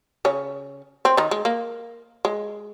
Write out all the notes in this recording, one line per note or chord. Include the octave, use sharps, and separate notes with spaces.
C#3 C#4
C4
D#3 D#4
G#3
A#3
G#3